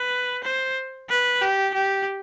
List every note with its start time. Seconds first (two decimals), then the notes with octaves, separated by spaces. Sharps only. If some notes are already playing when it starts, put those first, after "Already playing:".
Already playing: B4
0.44 C5
1.10 B4
1.42 G4
1.74 G4